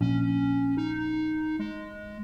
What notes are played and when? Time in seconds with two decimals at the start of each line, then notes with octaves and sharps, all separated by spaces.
0.01 A#1 C#4
0.77 D#4
1.59 G#3